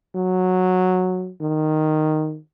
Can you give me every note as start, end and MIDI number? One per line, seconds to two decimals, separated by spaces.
0.15 1.31 54
1.41 2.38 51